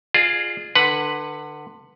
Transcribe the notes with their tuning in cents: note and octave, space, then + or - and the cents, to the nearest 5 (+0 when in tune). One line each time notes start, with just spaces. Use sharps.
F4 +0 G#4 +0 D5 +45
D3 +25 B4 +0 F#5 +0